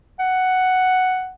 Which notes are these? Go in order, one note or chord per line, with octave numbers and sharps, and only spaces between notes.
F#5